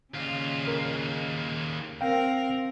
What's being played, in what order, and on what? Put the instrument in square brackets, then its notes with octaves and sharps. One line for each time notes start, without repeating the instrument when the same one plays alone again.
[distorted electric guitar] D#2 F4 [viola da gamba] C#3
[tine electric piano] A#4
[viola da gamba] C4 A#4 [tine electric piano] F5 G5